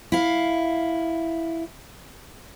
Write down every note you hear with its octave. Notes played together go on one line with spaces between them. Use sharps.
E4 F5